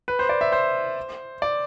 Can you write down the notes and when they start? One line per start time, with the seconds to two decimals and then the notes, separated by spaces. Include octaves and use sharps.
0.08 B4
0.19 C5
0.29 D5
0.41 E5
0.52 C5
1.42 D5